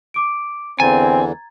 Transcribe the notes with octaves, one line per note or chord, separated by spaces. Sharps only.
D6 D7
E2 D3 E3 C4 G#5 A#5 G#6 A6